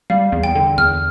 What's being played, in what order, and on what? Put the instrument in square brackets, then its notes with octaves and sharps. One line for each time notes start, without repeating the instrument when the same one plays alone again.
[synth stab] G3 [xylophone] F5
[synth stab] E2
[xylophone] G5
[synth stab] D3
[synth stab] E2 [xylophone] F6